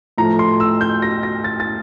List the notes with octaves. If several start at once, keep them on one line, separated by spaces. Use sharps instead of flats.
A2 F3 A3 A#5
C6
E6
G6
A#6
A#6
A6
A6